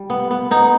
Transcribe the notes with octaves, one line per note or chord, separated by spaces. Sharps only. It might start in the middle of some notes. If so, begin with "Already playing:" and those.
Already playing: G3
B3
B3
B3 D#4